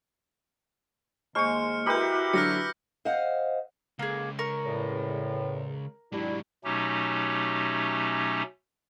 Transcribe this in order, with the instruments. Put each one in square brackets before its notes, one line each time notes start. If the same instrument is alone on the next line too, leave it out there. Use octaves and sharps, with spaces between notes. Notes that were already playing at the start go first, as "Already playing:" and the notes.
[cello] D#2 [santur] G#3 C5 C#6 [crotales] F6 C#7
[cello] E4 F#4 [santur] G4 A#4 B4 [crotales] E6 G6
[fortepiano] D3 F#3 [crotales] F6 A#6 C#7
[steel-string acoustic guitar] C5 D#5 F5 F#5
[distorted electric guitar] C#2 [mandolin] A#3 G#4
[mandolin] A#4 C#6
[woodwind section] E2 A2
[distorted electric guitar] G#2 F#3 [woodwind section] G3 D4 E4
[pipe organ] B2 F#3 A3 C#4 D#4 G4